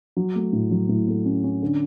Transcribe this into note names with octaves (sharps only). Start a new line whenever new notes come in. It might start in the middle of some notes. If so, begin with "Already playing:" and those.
F#3
A3
A2
F#3
A2
A3
C#4
C#4
D3